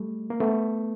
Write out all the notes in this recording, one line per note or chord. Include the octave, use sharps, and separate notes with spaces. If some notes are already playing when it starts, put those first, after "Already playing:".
Already playing: G3 A3
A#3
A3 B3